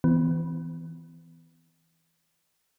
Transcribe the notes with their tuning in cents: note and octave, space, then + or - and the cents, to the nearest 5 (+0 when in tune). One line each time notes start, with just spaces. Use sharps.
E3 -10 B3 +35